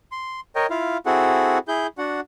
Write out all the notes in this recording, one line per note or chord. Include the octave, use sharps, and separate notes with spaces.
C6
A#4 C#5 D#5 G5
E4 F4 F5
C4 E4 F#4 G#4 A4 F#5
E4 G#4 G6
D4 F#4 F#5